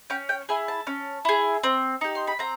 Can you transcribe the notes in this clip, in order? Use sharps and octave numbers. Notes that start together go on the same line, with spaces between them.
C#4 G5
G5
E4 G#4 G#5
A5
C#4
E4 G#4
C4
D#4 G4
C6
B5
C4 A#5